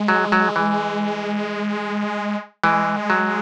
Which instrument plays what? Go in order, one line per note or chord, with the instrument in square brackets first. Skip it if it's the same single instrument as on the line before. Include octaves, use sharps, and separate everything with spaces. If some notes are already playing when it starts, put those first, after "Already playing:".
Already playing: [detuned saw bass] G#3
[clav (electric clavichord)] F#3
F#3
E3
[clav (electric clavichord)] E3 [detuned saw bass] G#3
[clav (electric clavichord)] F#3